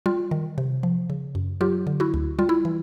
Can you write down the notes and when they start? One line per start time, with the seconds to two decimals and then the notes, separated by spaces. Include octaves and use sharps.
0.06 G3 F4
0.31 D#3
0.58 C3
0.83 F3
1.10 C#3
1.35 F#2
1.61 F#3 F4 G4
1.87 D3
2.00 E4 F#4
2.14 D2
2.39 G3 F4
2.49 E4
2.65 E3